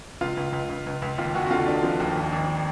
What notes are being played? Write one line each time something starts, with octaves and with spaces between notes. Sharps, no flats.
C#2 F4
C#2
C#2
C#2
C#2
C#2
D#2 F4
D#2 F#4
F#4
D3 F4
D#2 D4
F3
D#2
G#1
G#1